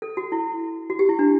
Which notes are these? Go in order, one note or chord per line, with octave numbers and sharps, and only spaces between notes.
A4
F#4
E4
F#4
G4
E4
D4